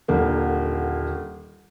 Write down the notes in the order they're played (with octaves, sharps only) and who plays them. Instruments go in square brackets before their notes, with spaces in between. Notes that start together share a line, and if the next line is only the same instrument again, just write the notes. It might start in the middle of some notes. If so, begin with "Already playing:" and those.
[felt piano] D#1 D3 A#3